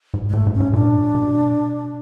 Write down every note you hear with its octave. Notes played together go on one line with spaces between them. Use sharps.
G#2
G#3
A2 A3
G#2
C#4
G#2
A#2 D4
B2